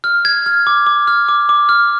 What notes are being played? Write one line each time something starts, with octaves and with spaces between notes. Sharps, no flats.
F6
G#6
F6
D6
D6
F6
D6
D6
F6